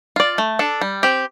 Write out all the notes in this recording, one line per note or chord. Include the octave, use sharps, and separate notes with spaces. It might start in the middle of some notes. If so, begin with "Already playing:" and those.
F4 D5
A3
D4 A4
G3
C4 G4